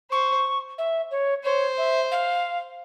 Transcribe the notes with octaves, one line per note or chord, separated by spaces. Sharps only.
C5 C#6
E5
C#5
C5 C#5
E5
F5